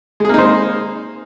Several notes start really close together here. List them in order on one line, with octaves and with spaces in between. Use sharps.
G#3 G#4 A#3 D#4 C5